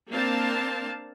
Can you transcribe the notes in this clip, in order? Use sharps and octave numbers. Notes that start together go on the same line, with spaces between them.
A#3 C4 D4 F5 A5